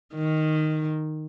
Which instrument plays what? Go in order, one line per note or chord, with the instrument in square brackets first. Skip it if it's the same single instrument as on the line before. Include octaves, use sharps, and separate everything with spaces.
[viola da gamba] D#3